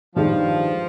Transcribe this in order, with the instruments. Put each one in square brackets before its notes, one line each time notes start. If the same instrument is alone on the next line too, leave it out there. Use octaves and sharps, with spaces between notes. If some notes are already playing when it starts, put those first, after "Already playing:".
[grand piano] G2 D#3 G#3 D#4 [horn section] F3